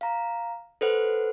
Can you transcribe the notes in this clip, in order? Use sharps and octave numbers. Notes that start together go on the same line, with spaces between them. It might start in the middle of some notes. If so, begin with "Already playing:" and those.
F5 A#5
A4 B4 C5 F#5